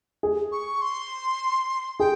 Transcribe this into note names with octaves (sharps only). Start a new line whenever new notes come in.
G#4
C#6
C6
G#4 G5